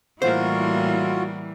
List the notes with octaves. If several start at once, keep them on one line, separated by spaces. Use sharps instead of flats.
A2 E3 G3 A#3 F4 F#4 A#4 C5